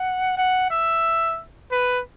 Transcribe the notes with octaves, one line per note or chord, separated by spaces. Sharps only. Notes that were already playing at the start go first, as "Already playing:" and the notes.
Already playing: F#5
F#5
E5
B4